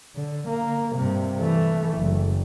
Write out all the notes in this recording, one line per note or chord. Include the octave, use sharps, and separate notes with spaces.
D3
A#3
G2 C3
E3 A3
F#1